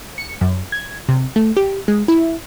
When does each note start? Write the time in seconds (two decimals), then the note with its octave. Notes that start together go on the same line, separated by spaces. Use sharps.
0.18 C#7
0.41 F#2
0.72 G#6
1.09 C3
1.36 A3
1.57 G4
1.88 G#3
2.08 E4